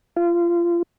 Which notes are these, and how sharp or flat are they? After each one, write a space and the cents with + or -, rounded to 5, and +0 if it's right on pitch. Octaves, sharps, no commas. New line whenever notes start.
F4 -25